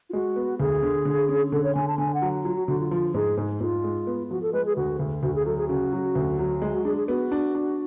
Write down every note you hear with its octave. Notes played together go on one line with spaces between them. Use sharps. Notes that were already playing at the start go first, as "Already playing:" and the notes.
F4
G#3 F#4
B3
D2 G#4
D3
D3
C#4
D3 A4
C#5
D3 G#5
A5
D3 G#5
F#5
F#3
F#3 F4
F#4
D3 F#4
F4
F3 F4
G#2 G#4
G#2
G#2 F4
G#3
B3
F3 F#4
A4
G#3 B4
G#4
D2 F#4
D2
D2 F#4
G#4
F#3 A4
G#4
C#3 F#4
F#3
D2
F#3
G#3 F#4
F#4
D4 G#4
G#4
B3 F#4
D4
D4